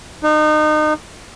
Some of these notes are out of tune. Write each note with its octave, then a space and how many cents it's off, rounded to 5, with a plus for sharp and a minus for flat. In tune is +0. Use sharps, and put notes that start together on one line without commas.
D#4 -30